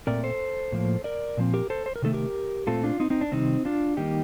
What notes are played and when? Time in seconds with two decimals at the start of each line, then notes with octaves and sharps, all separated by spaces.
0.07 A#2 A3 C4 A#4 D5
0.24 A4 C5
0.72 A2 F3 A#3
1.04 A#4 D5
1.37 A#2 F3 C4
1.54 G4 A#4
1.70 A4 C5
1.86 C5
1.96 A#4
2.02 C3 D#3 A3 A4
2.14 G4 A#4
2.67 A#2 A3 C4 F4 A4
2.84 D4 F4
3.00 C4 D#4
3.10 C4 D#4
3.21 D4
3.32 C3 D#3 G3 C4 D#4
3.65 D4 F4
3.97 D#3 G3 A#3 D#4 G4